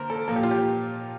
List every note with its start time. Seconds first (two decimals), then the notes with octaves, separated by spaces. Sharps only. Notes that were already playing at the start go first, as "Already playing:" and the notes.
Already playing: D3 A#3 A#4 C5
0.10 A4
0.28 A#2 F3 A#3 A4
0.36 G4
0.43 F4
0.51 G4